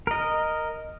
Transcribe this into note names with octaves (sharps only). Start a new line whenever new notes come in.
A#4 D#5